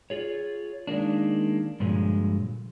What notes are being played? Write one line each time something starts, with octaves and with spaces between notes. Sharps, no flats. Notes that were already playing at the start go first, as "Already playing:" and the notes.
F4 G#4 C#5
D#3 G#3 A#3 D4
G2 A#2 D3 F3 F#3 G#3